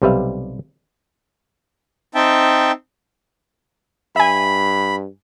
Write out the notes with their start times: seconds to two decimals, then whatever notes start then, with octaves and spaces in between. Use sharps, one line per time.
0.02 B1 C3 G3 B4 E5 F5
2.15 C4 D#4 E5 G5 A5
4.16 G2 E5 G#5 B5